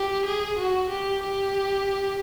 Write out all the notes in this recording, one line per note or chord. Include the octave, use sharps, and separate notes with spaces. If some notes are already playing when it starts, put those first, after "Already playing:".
Already playing: G4
G#4
F#4
G4
G4